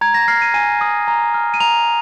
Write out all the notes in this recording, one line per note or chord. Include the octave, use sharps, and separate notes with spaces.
A#5 G#6
A#6
F6 C7
D#7
G#5 D#7
D#6
A#5
F6
D#7
A#5 F7